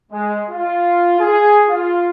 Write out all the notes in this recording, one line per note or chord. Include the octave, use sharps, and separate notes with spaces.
G#3
F4
G#4
F4